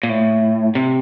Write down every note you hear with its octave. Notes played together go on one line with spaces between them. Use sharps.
A#2
A2
C3